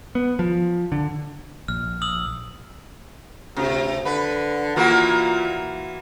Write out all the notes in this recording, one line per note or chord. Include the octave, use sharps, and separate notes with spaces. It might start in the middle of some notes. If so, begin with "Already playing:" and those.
B3
F3
D3
A#1 F6
D#6 E6 F#7
D2 C3
D3 B4
A#2 E3 A#3 F#4